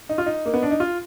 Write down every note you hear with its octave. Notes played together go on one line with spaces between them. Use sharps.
D#4
F4
D#4
A#3
B3
D4
D#4
F4